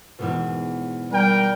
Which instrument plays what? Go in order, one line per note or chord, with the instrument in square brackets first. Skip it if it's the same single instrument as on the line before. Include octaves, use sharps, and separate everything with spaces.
[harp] E2 G#2 B2
[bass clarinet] G3 [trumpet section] A#4 G5